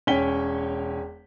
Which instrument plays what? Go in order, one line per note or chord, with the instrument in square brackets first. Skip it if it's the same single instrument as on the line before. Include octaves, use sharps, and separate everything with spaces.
[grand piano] E1 C#4 C#5 G5 B6 G7